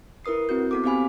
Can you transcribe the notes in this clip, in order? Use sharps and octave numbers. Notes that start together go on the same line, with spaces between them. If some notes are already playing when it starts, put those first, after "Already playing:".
E4 A#4 B4 D#6 C7
C4 E4 F#4 G6
B3 A4 D6
B3 C4 G4 F5 G#5 B5